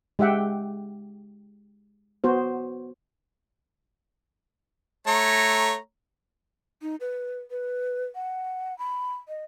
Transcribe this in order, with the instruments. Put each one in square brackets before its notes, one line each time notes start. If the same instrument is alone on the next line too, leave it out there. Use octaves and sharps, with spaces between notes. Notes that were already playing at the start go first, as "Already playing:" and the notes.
[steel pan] G#3 G4 E5 F#5 G5
B3 F#4 C5
[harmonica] A3 C#5 A#5
[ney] D#4
B4
B4
F#5
B5
D#5